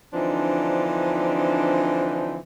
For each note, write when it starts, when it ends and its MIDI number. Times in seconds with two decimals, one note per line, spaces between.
0.13 2.39 50
0.13 2.39 52
0.13 2.39 53
0.13 2.39 60
0.13 2.39 62
0.13 2.39 63